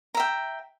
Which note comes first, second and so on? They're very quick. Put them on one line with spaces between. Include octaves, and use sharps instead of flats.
A#5 E5 G5